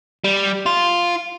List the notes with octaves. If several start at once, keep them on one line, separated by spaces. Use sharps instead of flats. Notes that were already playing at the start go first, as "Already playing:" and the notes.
G3
F4